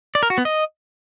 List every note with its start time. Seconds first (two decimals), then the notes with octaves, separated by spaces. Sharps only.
0.15 D5
0.23 A#4
0.30 F#4
0.38 B3
0.45 D#5